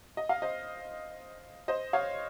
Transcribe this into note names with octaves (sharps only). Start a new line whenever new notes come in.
D#5
F5
C5 D#5
C5 D#5
C#5 F5